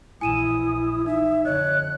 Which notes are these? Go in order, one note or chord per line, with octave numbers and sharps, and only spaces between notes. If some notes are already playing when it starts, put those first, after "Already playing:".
A#1 E3 E4 G#5 D#6 D#7 E7
D#4 E5
F2 D3 C#5 D#5 F#6